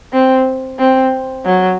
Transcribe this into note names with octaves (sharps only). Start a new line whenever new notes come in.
C4
C4
F#3